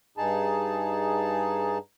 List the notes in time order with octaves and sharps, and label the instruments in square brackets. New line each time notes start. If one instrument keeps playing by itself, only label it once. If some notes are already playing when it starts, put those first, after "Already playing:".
[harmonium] G2 D#4 G#4 A5